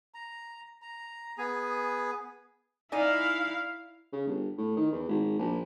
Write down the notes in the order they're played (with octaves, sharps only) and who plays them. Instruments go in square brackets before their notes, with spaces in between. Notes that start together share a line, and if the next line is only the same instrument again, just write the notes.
[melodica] A#5
A#5
B3 G#4 G#5
[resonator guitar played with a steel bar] D#4 D5 G#5 [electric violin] E4 F5
[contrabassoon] C#3
G1
A2
D#3
E2
G#1
A#1